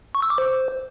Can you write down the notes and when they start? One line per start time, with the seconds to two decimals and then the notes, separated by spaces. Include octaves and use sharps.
0.15 C#6
0.22 E6
0.30 D6
0.38 C5